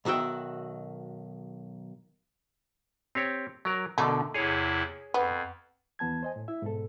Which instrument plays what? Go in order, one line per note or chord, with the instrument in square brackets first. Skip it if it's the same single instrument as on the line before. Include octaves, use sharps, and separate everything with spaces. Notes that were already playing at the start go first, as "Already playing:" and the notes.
[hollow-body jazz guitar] B1 D#3 F#4 E5 G5
[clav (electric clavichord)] C4 G4 C#5
F#3 A#4
[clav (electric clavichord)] B2 D3 [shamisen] A3 A#3 D#4
[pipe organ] E2 C3 E4 [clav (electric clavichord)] G#4 C#5
[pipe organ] F2 [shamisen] B3
[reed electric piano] D#2 E3 B3 A5 G#6
C5 D#5 G#5
A2
E4 E5
G#2 B2 A4